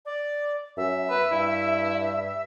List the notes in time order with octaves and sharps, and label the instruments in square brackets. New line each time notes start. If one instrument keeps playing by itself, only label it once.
[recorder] D5
[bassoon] F#2 [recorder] E5
[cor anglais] B4
[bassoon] G2 [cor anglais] E4